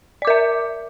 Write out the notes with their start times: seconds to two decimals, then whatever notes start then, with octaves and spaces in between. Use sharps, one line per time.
0.22 D5
0.25 D6
0.27 A#4
0.30 E5